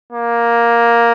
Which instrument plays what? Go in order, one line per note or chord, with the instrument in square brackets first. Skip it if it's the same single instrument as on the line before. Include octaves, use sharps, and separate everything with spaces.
[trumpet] A#3